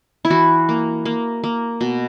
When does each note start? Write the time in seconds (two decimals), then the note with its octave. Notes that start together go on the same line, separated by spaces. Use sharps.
0.25 E4
0.30 E3 F#4
0.69 A#3
1.05 A#3
1.44 A#3
1.81 B2